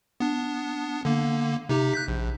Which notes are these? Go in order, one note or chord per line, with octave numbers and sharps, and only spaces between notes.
B3 D4
D3 A#3
C3 D#4 G4
F#6 G6 B6
A#1